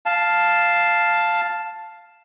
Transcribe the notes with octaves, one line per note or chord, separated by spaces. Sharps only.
F5 A5